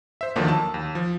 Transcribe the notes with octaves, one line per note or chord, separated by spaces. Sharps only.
C5 E5
D#2 D3 D#3 F3 F#3 A#3
A5 E6
D#2
F3